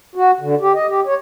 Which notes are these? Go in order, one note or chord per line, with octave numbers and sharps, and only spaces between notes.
F#4
D3
G4
D#5
G4
C#5